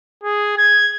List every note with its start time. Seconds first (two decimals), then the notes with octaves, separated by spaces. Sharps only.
0.24 G#4
0.58 G#6